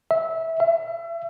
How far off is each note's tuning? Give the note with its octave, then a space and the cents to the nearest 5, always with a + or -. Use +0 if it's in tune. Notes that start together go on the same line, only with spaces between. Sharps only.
E5 -15
E5 +35